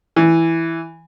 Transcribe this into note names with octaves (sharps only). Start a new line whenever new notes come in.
E3